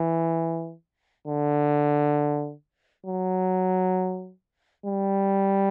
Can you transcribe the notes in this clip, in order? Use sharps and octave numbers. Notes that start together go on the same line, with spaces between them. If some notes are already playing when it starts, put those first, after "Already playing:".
Already playing: E3
D3
F#3
G3